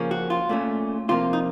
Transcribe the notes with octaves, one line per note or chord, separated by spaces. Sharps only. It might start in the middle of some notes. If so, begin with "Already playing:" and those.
Already playing: C#3 F3 A#3 C#4
F#4
F4
A#2 A3 C#4
C3 F3 A#3 F4
D#4